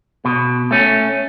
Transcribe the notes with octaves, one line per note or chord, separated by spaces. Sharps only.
B2
A3 C#4